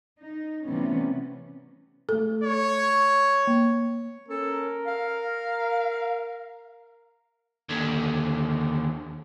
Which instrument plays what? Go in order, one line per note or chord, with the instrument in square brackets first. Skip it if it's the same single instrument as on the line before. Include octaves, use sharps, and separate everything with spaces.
[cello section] D#4
C3 E3 G3 A3 B3 C#4
[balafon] A3 A4
[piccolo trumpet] C#5
[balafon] A#3
[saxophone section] C#4 A4 [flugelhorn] A#4
[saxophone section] F5
[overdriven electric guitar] D#2 D3